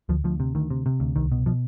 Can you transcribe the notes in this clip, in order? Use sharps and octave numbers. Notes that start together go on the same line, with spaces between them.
D2 F3
D2 F3
C3
D2 D#3
C3
C3
D2
C2 D#3
B2
B2 F3